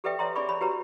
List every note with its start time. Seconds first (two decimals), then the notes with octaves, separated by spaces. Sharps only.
0.04 G4 A4 B4 D5 E5 G5
0.19 C#5 D5 E5 A#5 C6
0.36 D4 G#4 D5 G#5 B5 C#6
0.49 C#5 B5
0.61 F#4 G4 B4 C#5 A#5